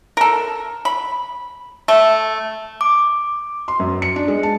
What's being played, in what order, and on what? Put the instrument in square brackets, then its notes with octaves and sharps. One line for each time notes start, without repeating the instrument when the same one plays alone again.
[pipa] A4 A#4
B5
A3
[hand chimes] D6
[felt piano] C6
F#2
C#7
D4
G#3
A5